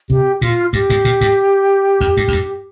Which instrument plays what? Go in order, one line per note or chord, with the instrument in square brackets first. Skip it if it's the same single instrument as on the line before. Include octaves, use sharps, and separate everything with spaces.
[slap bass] C3 [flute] G4
[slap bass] A#2 [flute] F4
[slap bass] G2 [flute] G4
[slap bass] G#2
A#2
G#2
F2
G2
F2
G2